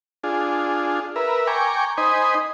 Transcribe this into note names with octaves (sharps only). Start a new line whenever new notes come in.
D4 F4 G#4
A#4 B4 E5
G5 G#5 A#5 C#6 D6
D#4 C5 D#5 G#5 B5